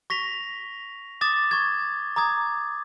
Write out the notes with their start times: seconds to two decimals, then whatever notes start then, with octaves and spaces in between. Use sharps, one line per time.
0.10 C#6 A#6 B6 F7
1.21 D6 D#6 A6 E7
1.51 C#6 G#6
2.16 A#5 D6 D#6 G#6